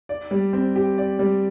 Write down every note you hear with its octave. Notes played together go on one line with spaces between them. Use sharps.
D5
G3
C4
G4
D5
G3